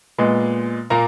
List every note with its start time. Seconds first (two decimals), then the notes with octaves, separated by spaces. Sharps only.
0.18 A#2 G#3 B3
0.90 A#2 A#3 A#5